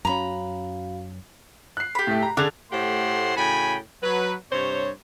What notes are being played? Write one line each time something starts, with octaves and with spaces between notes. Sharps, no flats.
F#2 C#4 F#4 F5 A#5 B5
F#6 C7
G4 B5
A2 A3
A#5
D3 D4 G#4 F7
A2 A3 G4 C5 F#5 C6
A2 C#3 F#4 G5 G#5 B5
F#3 B4
G2 C3 C5 C#5